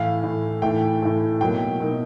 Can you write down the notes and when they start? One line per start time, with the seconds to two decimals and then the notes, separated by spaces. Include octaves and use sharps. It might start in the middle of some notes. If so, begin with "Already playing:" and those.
Already playing: A2 E3 A3 F5
0.23 A2 E3 A3
0.62 A2 E3 A3 G5
1.02 A2 E3 A3
1.41 B2 F#3 A#3 D#4 G5
1.80 B2 F#3 A#3 D#4